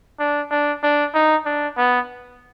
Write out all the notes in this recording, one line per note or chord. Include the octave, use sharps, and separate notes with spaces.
D4
D4
D4
D#4
D4
B3